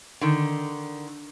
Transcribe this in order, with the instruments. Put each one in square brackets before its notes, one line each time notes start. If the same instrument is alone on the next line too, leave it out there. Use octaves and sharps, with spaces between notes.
[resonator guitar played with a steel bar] D3 D#3